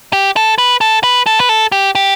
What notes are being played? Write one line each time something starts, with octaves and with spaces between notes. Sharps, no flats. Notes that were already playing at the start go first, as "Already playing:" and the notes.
G4
A4
B4
A4
B4
A4
B4
A4
G4
G4